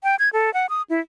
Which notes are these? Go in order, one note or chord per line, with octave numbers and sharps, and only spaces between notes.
G5
G#6
A4
F#5
D#6
E4